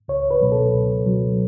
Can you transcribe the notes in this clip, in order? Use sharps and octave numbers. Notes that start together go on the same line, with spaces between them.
C#2 C#5
B4
B2 F#3
A4
C#2
B2 F#3